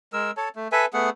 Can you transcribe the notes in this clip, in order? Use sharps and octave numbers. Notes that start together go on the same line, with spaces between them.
G#3 A#4 E6
A4 C#5 A5
A3
A4 B4 E5 G#5
A3 B3 G#4 F#5